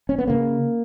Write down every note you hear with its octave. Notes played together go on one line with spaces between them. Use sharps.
C#4
B3
C#3 A#3